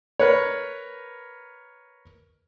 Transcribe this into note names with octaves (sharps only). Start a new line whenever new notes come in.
A#4 B4 C#5